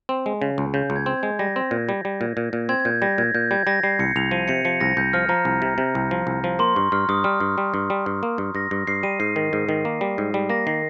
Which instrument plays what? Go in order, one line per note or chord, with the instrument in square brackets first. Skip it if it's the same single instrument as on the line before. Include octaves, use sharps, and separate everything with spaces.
[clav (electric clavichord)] C4
G#3
C#3
C#2
[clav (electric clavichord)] C#3 [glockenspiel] G6
[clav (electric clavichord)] C#2
[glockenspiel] G#6
[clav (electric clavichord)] C4
[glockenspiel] G#6
[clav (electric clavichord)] G#3
[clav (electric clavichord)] G3 [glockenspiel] A#6
[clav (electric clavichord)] C4
A#2
G3
G3
A#2
A#2
A#2
[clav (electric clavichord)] C4 [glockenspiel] G#6
[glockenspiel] G#6
[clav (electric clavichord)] A#2 [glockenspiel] G6
[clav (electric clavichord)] G3 [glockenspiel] A#6
[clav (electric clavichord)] A#2 [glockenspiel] G#6
[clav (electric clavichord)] A#2 [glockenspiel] G6
[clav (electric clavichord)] G3 [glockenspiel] G#6
[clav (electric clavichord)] G3 [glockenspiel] A#6
[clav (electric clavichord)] G3 [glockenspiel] C7
[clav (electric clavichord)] C2 [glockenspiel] C#7
[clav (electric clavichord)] C2 [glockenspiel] F7
[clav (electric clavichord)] F3 [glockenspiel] D#7
[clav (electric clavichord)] C3 [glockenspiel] C#7
[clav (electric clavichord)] F3 [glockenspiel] C#7
[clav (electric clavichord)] C2 [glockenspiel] A#6
[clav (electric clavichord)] C2 [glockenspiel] G6
[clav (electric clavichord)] F3 [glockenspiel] F6
[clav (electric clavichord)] F3 [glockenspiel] A#5
[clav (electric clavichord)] C2
C3
C3
C2
F3
C2
F3
[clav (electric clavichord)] A#3 [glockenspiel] C6
[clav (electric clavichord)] G2 [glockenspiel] C#6
[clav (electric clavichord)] G2 [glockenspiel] F6
[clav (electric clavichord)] G2 [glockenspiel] D#6
[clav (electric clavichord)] G3 [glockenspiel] F6
[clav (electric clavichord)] G2
G3
G2
G3
G2
A#3
G2
[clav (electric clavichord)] G2 [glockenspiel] A#6
[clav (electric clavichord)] G2
[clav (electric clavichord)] G2 [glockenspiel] C7
[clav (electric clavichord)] G3 [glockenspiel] D#7
[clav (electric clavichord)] G#2 [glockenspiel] C7
[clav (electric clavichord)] D#3
G#2
D#3
A#3
G3
G#2
G3
[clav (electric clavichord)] A#3 [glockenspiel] A#6
[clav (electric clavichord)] D#3 [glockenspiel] C7